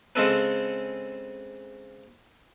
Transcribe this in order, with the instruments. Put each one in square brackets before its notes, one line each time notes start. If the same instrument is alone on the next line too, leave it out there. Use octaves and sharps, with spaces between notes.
[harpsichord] C#3 G#3 C4 C#4 A4 B4